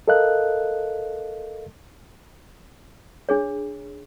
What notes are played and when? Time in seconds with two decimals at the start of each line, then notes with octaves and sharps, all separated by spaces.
0.08 A4 A#4 D#5 F5 F#6
3.29 D4 G#4 C#5